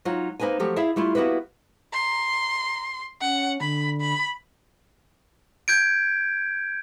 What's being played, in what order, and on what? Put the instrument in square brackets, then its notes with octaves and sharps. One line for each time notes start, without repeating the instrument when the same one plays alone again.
[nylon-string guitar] F#3 D#4 F4 C#5
A#3 D#4 B4 C5 G#5
F3 F#3 A3 G4
E4 G#4 D5 E5 F5
G3 A3 E4 F4
A#3 B3 E4 F#4 G4 B4
[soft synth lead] A#5 [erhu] C6
[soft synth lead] C#4 [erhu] F#5
[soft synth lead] D3 [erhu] B5
[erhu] B5
[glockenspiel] G6 G#6 D7